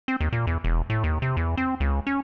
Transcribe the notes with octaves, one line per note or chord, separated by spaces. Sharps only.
C4
D#2
A#2
E2
E1
A2
D#2
C3
E2
C4
C#2
C#4